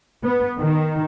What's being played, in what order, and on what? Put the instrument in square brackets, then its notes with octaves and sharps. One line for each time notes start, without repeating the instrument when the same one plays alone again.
[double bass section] B3
D#3